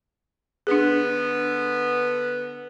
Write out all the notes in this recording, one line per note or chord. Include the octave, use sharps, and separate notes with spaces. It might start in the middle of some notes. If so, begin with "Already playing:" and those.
D3 B3 D4 G#4